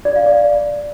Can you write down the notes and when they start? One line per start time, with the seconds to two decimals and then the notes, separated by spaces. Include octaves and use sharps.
0.05 D5
0.16 F5
0.26 D5